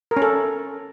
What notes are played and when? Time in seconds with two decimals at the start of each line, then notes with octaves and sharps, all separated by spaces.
0.11 A#4
0.17 C#4
0.22 A4